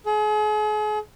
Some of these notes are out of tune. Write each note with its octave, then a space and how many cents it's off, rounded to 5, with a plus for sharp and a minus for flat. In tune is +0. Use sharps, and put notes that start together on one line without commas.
G#4 +40